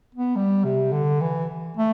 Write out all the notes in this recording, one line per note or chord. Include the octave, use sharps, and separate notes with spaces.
B3
G3
C3
D3
E3
A3